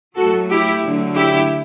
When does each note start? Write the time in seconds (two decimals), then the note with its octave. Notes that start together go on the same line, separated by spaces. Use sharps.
0.16 A2 F#3 A3 F#4 A4
0.50 E4 G4
0.83 D2 D3 F#3 A3
1.16 E4 G4